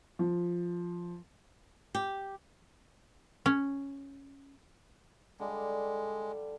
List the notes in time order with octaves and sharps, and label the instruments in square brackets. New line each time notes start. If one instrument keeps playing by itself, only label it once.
[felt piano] F3
[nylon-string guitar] G4
[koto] C#4
[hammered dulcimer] D3 G3 F5 [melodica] G#3